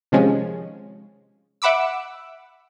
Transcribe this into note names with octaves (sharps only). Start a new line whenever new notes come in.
C3 D#3 F3 G#3 C#4
E5 F#5 B5 D6 E6